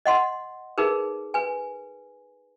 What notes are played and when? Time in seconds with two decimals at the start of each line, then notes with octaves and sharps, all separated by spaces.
0.06 D#5 F#5 C6
0.78 D#4 G#4 A#4 B4
1.34 B4 G#5